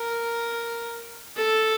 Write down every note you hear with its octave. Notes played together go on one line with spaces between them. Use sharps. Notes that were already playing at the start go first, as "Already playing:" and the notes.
Already playing: A#4
A4